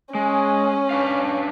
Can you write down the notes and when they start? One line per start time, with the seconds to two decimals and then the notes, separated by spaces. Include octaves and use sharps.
0.15 G#3 C#4
0.91 D4 B4 F5